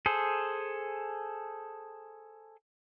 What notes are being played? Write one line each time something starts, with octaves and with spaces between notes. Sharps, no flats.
G#4 A4 C5